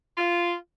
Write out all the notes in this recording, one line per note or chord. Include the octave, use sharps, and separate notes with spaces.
F4